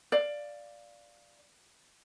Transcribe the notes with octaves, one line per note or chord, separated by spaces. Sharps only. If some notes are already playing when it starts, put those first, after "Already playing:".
D5 F5